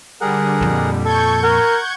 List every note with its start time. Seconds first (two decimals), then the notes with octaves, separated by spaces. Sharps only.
0.21 D3 G3 G#4 A#4 F#5
0.61 F2 A#2
1.05 A4 C#6 G6 G#6
1.43 A#4 F#5